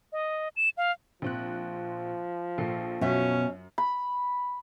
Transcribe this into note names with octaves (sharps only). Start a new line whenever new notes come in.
D#5
E7
F5
A#1 F3 C4 F#6
A#1 A4 C7
F#2 B2 C#4 E5
B5